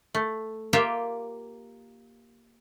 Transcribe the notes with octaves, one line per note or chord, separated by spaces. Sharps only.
A3
A#3 F4 G4 E5 G5